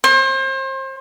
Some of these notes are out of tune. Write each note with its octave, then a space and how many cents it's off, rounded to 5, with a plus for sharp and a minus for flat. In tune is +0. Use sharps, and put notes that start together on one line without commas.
C5 +35